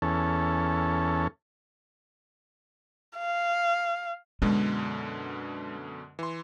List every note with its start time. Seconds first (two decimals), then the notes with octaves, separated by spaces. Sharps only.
0.02 E2 C#4 A4
3.18 F5
4.42 F#2 B2 D3 G#3
6.19 E3 C6